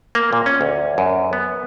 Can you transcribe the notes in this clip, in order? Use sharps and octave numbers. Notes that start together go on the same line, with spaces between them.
A#3
A#2
C#4
D2
F#2
B3